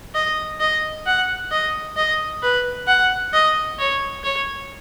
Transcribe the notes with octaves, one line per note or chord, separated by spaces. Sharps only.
D#5
D#5
F#5
D#5
D#5
B4
F#5
D#5
C#5
C#5